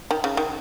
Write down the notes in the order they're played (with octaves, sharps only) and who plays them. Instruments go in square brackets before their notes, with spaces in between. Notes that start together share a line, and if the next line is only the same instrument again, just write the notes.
[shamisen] D#3
C#3
D#3